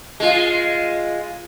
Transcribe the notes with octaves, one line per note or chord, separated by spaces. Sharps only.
G#3 F4